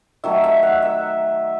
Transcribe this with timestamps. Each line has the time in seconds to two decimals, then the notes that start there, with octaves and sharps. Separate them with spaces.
0.24 D#3 F#3 A3 E5
0.44 E5
0.63 F#5
0.82 E5